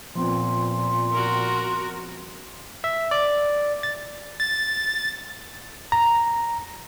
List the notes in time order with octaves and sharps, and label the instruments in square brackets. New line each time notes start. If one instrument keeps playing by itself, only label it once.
[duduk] A#2 [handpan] F3 B3 C4 [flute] C6
[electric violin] F#4 A#4
[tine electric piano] E5
D5
A6
[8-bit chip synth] A6
[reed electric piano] A#5